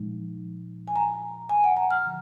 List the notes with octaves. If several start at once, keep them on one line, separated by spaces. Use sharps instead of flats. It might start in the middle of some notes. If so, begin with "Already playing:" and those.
Already playing: A#2 F3 G#3 D#4
G#5
A#5
G#5
F#5
A#5
F6
D3 F3